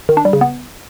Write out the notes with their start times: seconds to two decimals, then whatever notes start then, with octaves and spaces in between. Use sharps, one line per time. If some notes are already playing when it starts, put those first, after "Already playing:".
0.09 D#3
0.17 D4
0.25 G3
0.33 C#3
0.41 B3